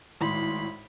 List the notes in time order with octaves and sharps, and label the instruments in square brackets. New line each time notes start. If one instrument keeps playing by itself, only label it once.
[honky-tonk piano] G#1 A2 C6 [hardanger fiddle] B5